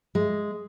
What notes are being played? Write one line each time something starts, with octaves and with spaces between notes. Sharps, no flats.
G#3